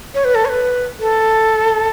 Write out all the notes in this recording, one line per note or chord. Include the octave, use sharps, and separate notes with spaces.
C#5
B4
A4
C#5
B4
A4